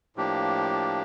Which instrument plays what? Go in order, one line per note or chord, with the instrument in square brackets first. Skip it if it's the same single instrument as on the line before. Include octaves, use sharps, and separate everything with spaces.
[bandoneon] A2 F3 A#3 D4 G4